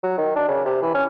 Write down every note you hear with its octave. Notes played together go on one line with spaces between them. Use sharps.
F#3
D#3
D4
C#3
C3
E3
C#4